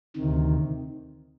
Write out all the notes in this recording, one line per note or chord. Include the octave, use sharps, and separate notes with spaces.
D2 C3 D#3